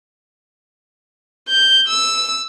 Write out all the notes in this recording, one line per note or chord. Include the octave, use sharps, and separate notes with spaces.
G6
E6